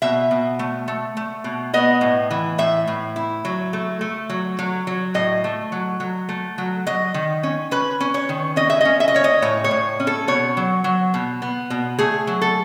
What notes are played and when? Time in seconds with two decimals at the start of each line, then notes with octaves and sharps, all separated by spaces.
0.02 B2 E5
0.31 B2
0.59 A3
0.88 A3
1.17 A3
1.44 B2
1.74 B3 D#5
2.01 A2
2.31 E3
2.58 A2 E5
2.87 A2
3.16 E4
3.45 F#3
3.73 A3
4.01 A3
4.29 F#3
4.59 F#3
4.87 F#3
5.14 A2 D#5
5.44 A3
5.72 F#3
6.00 F#3
6.29 A3
6.58 F#3
6.86 F#3 D#5
7.14 D#3
7.43 C#4
7.71 C#4 B4
8.00 C#4
8.14 C#5
8.29 D#3
8.56 C#4 D#5
8.70 E5
8.81 C#4 D#5
9.00 E5
9.08 D#5
9.14 C#4 C#5
9.24 D#5
9.42 A2 C#5
9.64 C#5
9.71 A2
10.00 C#4
10.07 A4
10.28 B2 C#5
10.57 F#3
10.84 F#3
11.14 B2
11.42 B3
11.70 B2
11.99 A3 G#4
12.27 F#3
12.42 A4